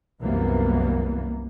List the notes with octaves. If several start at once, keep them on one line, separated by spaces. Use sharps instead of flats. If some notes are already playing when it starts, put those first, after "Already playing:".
C2 F#2 E3 A#3 B3